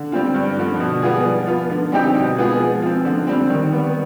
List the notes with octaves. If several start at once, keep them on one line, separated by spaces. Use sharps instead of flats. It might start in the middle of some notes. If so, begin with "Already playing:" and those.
Already playing: D3
G3 C4 F4
G2
D3 F3
B2
G3 B3 F4 G#4
F3
B3 F4
D3
G3 C4 D#4 G4
B2
G#3 B3 F4 G#4
F3
C4 F4
D3
G3 C4
D#3
G3 B3